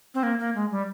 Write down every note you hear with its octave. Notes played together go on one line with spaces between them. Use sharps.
C4
A#3
A#3
G#3
G3